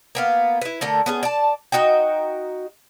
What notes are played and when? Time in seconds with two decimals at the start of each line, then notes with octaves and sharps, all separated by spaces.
0.15 A#3 B3 F5
0.61 E4 B4
0.81 D3 A3 A#4
1.06 B3 C#4 G#4
1.23 D5 A5
1.72 D#4 F#4 D#5 G5